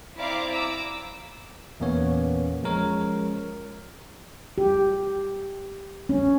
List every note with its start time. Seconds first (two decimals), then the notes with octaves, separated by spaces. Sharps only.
0.16 C4 E4 D5 F5 A#5 D6
0.52 A#5 D6 E6
1.80 E2 A#2 A#3 B3 C#4 C#5
2.63 F3 G#3 C#4 A#4 C#5
4.58 G4
6.09 C#4